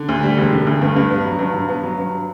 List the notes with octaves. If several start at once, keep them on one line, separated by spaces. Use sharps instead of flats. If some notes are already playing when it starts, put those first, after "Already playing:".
Already playing: D3
D2
G3
E1
D3
D2
G2
G2
B3
F#3
G2
G2
B3
F#3
G2